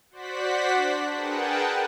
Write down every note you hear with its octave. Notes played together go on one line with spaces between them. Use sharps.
F#4 C5 D5 F#5 B6
D4
G#4 A#4 B4 F#5 G5 A5